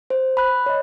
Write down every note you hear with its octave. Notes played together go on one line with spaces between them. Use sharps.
C5
B5 F#6
C#5 D#5